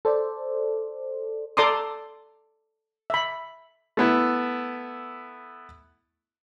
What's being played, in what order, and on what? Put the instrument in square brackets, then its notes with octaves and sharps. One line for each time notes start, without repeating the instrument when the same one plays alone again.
[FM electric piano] A4 C5 D5
[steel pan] A4 D5 A#5 C6 D6 D#6
E5 B5
[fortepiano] A3 B3 E4